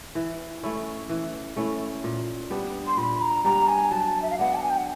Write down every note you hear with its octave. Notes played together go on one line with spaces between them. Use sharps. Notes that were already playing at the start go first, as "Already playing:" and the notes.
E3
A3 C#4 E4
E3
A3 C#4 E4
A#2
G3 B3 D4
C6
A#2 B5
A#5
G3 B3 D4 A#5
G#5
F#3 A5
E5
F5
B3 D4 F#5
A5
G#5
G5
F#5